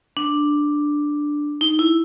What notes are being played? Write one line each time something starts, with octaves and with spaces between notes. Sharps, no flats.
D4
D#4
E4